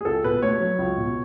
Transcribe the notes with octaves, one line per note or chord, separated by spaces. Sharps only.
G#4
C#2 A4
B2 B4
A3 C#5
F#3
C#2
B2